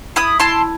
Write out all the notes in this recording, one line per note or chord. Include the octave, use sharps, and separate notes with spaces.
E4 B5 D#6
E4 A5 C6